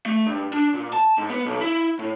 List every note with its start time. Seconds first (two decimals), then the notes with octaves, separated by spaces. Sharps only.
0.06 A3
0.26 G2
0.53 D4
0.74 A#2
0.93 A5
1.18 G#2
1.30 B3
1.46 B1
1.61 E4
1.99 A2